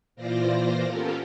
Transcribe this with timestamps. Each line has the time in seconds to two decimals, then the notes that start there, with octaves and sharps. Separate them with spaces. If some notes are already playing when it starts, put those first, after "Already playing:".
0.16 A#2 E3 F4 C5 D5 A#6
0.86 B3 C#4 F4 G4 A4 A#4